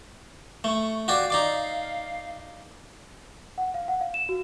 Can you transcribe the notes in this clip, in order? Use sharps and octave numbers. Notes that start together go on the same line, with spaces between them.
A3 C#6
F#4 G4 D5 F5
D#4 D5 D6
F#5
F5
F#5
F5
E7
F#4